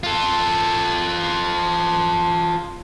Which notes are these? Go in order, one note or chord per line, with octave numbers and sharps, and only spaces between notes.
F4 A4